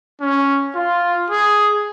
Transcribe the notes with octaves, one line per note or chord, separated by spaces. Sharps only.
C#4
F4
G#4